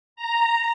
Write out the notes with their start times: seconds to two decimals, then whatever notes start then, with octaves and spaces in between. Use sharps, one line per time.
0.16 A#5